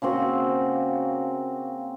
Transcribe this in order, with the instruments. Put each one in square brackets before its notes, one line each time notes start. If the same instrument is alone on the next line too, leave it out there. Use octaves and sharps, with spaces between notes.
[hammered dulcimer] C#3 A#3 C4 F#4